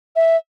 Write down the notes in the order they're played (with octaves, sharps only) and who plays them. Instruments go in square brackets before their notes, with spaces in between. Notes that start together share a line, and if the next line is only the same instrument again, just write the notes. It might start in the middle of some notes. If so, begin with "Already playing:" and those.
[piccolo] E5